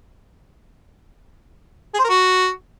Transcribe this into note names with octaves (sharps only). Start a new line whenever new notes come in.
G#4
C5
A#4
F#4